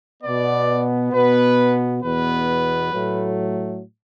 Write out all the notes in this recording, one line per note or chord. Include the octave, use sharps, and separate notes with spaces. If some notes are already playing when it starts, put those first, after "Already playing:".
B2 B3 D5
B2 B3 B4
E2 B2 B3 B4
A2 F#3 A3